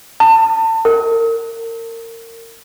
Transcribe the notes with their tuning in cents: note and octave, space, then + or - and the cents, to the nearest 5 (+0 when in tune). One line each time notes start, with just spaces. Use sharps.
A5 +30
A#4 -30